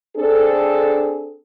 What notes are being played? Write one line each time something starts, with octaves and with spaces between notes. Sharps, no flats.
C4 D4 G#4 A4